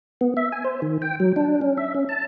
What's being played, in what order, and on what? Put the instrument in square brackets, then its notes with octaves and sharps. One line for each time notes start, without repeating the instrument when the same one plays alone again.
[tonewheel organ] B3
E5
G#5
C5
D#3
G5
F#3
D4
C#4
E5
C#4
A5